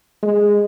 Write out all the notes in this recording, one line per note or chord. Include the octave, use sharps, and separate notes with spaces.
G#3